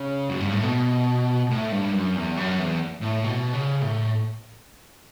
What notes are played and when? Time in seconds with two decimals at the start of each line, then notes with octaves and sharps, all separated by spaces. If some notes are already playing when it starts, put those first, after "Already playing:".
Already playing: C#3
0.29 F#2
0.41 G2
0.52 A2
0.63 B2
1.51 A2
1.72 G2
1.93 F#2
2.16 E2
2.37 F#2
2.59 E2
3.02 A2
3.24 B2
3.53 C#3
3.82 A2